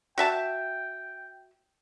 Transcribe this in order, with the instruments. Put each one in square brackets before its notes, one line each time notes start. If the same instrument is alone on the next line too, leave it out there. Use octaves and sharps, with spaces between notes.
[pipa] F#4 E5 A5 [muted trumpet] G5